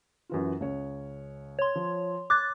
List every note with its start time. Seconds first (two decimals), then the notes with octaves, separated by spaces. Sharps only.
0.29 F#2 E3 F4
0.60 C#2 C#4 C#5
1.59 C#5 C6
1.75 F3
2.30 D6 F#6 G#6 A6